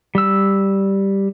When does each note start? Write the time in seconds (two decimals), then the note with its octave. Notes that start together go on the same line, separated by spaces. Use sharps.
0.15 G3 E6